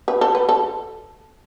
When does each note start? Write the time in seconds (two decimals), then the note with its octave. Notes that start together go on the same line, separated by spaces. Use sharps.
0.08 B4
0.21 A4
0.35 B4
0.49 A4